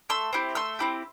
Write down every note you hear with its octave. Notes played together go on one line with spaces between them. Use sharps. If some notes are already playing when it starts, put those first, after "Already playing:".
A3 C6 E6
C4 E4 G4
A3 C6 E6
C4 E4 G4